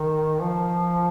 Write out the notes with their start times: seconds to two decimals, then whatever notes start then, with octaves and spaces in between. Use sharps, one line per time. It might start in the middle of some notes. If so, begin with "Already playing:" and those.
Already playing: D#3
0.42 F3